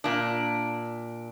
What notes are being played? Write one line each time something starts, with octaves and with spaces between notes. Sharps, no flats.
A#2 D4